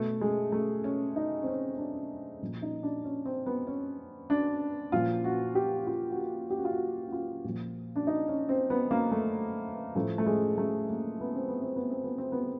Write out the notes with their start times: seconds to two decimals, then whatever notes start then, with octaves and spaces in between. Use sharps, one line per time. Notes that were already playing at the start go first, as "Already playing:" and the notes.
Already playing: B2 A3
0.21 G#3
0.52 A3
0.84 C#4
1.16 D#4
1.43 C4
1.47 C#4
1.75 C#4
1.78 D4
2.42 A#2 F3
2.62 D#4
2.83 D4
3.04 C#4
3.26 C4
3.46 B3
3.67 C#4
4.30 D4
4.92 A#2 F3 F4
5.24 F#4
5.55 G4
5.87 F4
6.11 F#4
6.18 G4
6.50 G4
6.58 F#4
6.65 F4
6.72 F#4
7.08 F#4
7.12 F4
7.44 A#2 F3
7.96 D4
8.07 D#4
8.28 C#4
8.49 C4
8.70 B3
8.91 A#3
9.11 A3
9.95 A2 F3 A3
10.18 A3
10.26 G#3
10.58 A3
10.89 A#3
11.21 B3
11.35 C4
11.48 B3
11.62 C4
11.76 B3
11.90 C4
12.04 B3
12.18 C4
12.32 B3